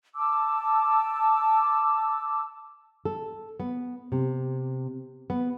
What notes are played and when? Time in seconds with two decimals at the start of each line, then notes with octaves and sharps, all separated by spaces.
0.15 A5 D6 E6
3.05 A4
3.60 B3
4.12 C3
5.30 B3